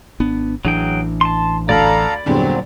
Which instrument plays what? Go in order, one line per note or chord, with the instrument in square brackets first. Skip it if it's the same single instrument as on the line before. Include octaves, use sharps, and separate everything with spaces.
[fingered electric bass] G#1 B3 D4
[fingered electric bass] A1 E3 D4 [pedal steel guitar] F#3 G#4 G5
[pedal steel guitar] A5 C6
[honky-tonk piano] D2 [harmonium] A4 F5 A#5 [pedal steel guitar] D5 B5
[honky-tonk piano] E2 G2 D3 [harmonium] A#2 F#3 C4